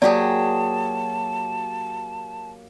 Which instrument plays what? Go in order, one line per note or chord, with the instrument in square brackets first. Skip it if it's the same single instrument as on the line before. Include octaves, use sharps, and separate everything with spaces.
[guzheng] F#3 G4 G#4 [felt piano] A#3 [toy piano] D5 [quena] A5